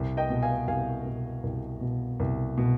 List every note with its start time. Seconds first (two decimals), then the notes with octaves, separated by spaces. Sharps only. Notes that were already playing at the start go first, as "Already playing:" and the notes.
Already playing: C2
0.17 D#5 G5
0.30 B2
0.43 F5 G#5
0.68 C2 F5 G#5
1.05 B2
1.43 C2
1.81 B2
2.20 C2
2.58 B2